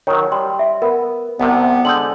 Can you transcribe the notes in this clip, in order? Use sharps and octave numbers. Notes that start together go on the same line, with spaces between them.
D#3 F#3 C#5
G3 C6
E5
B3 A#4
C2 C3 B3
D3 G#3 G6 F#7